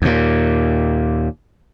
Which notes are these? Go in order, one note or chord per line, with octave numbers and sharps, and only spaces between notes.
D#2 A#2